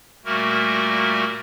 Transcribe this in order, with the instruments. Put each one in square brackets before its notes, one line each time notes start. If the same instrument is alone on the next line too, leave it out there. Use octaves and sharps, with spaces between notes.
[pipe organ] A#2 G3 A3 A#3 F#4 A#4